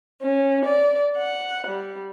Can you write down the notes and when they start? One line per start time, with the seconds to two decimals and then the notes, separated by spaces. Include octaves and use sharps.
0.22 C#4
0.65 D5
1.16 F#5
1.68 G3